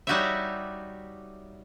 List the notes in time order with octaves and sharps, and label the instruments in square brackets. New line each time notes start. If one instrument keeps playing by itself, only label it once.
[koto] G3 D#4 F#4 G4 C#5 E5